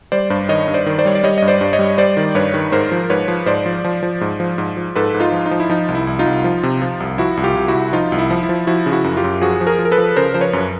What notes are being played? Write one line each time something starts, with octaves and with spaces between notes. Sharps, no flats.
G3 C5 D5
G2 C5 D5
D#3 C#5 D#5
G2
C5 D5
D#3
C5 D5
G3 C#5
D5
G3 C#5 D#5
G2 D#5
C5 D5
G2
C#5 D#5
G3
G3 C5 D5
D#3
G2 B4 C#5
D#3
G#2 A#4 C5
F3
G#2 B4 C#5
F3
G#2 C5 D5
F3
F3
F3
G#2
F3
G#2
F3
G#2 A4 B4
G#2
D#4 F4
F3
D#4
F3
E4
F3 D#4
C2
E4
C2
D#4 F4
C2
F3
C3
F3
C2
F3 E4 F#4
C2
F4 G4
C2
E4 F#4
C2
F3 D#4 F4
C2
E4
F3
E4
F3
F3 E4 F#4
C#3
E4 F#4
F#2
F4 G4
F#2
F3 F#4 G#4
F3
G#4 A#4
F3
A#4
A4 B4
F3
C#3 A#4 C5
F3 C5
B4 C#5
F#2